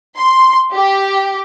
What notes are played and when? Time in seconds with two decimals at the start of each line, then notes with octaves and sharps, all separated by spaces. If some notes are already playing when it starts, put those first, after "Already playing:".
0.17 C6
0.75 G4